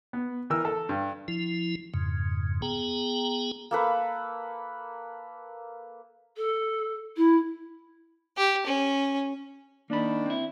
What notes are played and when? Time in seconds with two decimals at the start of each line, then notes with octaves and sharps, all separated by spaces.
0.13 B3
0.50 E3 A#4 E6
0.65 A4
0.89 G2
1.28 F3 E4
1.94 F2 G#2 C#3
2.62 B3 G#4 G5 A#5
3.71 A#3 A4 B4
6.37 A4
7.17 E4
8.38 G4
8.67 C#4
9.90 D#3 A#3 D4 B5
10.26 C4 E4